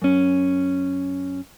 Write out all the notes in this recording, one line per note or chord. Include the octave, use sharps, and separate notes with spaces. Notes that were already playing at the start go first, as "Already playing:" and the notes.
F#2 C#4